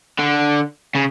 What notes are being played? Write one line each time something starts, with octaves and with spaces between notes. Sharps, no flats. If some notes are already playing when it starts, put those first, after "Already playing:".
D3
C#3